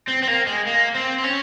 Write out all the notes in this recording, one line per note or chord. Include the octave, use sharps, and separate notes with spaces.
C4
C4
A#3
G#3
A#3
C4
C4
C#4